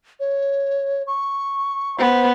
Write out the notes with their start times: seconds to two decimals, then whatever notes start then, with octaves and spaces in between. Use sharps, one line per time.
0.20 C#5
1.07 C#6
1.98 B3 C5